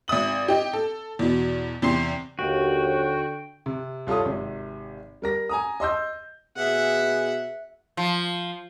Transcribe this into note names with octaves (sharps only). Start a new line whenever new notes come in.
G#1 E5 D#6 F#7
G4 D#5
A4
E2 B2
E2 C3 C6 C7
D#2 D3 F#4 G5
C3
C2 F4 A4 C#5 D#6
G#1 C3
G3 A#4 A#6
G#5 A#5 D#6
D#5 C6 E6 G6
B2 G#4 E5 F#5
F3